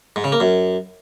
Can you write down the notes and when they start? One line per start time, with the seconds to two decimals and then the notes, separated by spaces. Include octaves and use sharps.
0.16 G#2
0.24 C#3
0.32 A#3
0.40 F#2